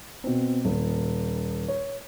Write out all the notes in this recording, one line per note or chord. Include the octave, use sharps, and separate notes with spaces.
B2 C4
D#1
C#5